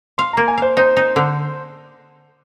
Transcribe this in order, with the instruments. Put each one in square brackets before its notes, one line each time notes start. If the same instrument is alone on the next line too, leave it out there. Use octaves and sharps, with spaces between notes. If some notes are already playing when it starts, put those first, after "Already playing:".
[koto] F5 [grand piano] C6
[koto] A#3 [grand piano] A#5
[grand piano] G#5
[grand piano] C5 [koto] F5
[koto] D#4 [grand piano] C5
[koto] D#4
D3